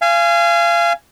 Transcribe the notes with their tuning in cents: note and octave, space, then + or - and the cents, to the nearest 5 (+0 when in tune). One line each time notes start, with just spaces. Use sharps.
F5 -30 G#5 +0